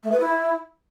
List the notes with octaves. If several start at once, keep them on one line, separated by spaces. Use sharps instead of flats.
A3
B4
E4